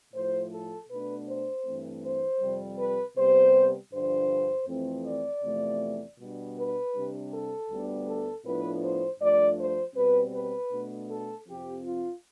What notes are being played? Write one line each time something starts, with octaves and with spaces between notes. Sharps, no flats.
A2 F3 A3 C5
A4
B2 A3 D4 B4
C5
G2 E3 A3 C4
C5
F2 C3 G3
B4
C3 G3 B3 C5
G2 D3 F3 C5
F2 E3 A3 C4
D5
E2 C3 F3 A3
B2 G3 D4
B4
C3 G3 D4
A4
D2 D3 G3 B3 D4
A4
A2 F3 B3 D4 B4
C5
G2 F3 A3 D4 D5
C5
B2 G3 C4 B4
B4
B2 A3 D4
A4
F2 C3 F3 C4 G4
F4